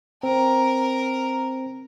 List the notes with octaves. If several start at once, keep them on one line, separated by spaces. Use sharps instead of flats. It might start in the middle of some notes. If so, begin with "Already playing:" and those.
C4 A#4